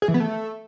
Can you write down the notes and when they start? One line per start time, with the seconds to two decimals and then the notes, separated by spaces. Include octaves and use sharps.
0.02 G#4
0.08 E3
0.14 B3
0.20 A3